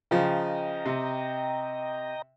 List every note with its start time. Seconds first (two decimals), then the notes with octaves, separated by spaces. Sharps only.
0.11 C#3 F3 D#5 G5 A#5
0.86 C3